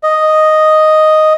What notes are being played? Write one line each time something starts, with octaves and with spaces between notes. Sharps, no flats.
D#5